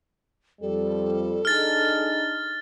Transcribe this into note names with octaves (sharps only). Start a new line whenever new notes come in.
F2 G3 A4
D4 D#4 G#4 F6 A6